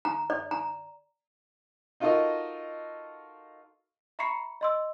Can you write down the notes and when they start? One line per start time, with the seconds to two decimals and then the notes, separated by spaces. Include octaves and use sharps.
0.05 A#5
0.30 D5
0.51 A#5
2.00 D#4 F4 F#4 A4 A#4 D#5
4.19 E5 A#5 B5 C#6 C7 C#7
4.61 D#5 C6 E6